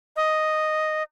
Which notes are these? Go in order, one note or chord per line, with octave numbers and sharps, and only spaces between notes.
D#5